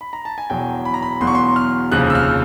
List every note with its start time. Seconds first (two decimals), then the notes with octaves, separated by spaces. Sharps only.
0.01 B5
0.13 A#5
0.25 A5
0.38 G#5
0.50 E1 E2 B2 F#3 G5
0.85 B5
0.94 A#5
1.03 B5
1.20 E1 E2 B2 F#3 C6
1.27 C#6
1.35 C6
1.56 F6
1.92 F1 D#2 C#3 F3 F#6
2.10 E6
2.15 F6